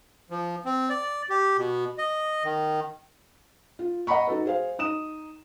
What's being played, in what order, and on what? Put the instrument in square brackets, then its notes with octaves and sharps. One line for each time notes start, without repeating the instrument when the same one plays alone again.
[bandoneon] F3
C4
D5
G4
B2
D#5
D#3
[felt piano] F4
D#5 F#5 A#5 B5 C#6
D#4 F#4 A4 B4
G#4 C5 F5
D#4 D#6 E7